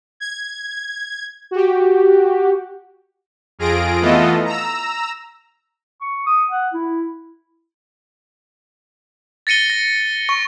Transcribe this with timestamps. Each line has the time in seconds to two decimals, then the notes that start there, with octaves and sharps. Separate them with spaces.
0.20 G#6
1.51 F#4 G4
3.59 F2 F4 G#4 A#6 D7
4.01 E3 A3 B3 F4 A4 D#5
4.45 A#5 E6
6.01 C#6
6.26 D#6
6.51 F#5
6.74 E4
9.47 A6 A#6 C#7 D#7 G7
9.70 A#6
10.29 C#6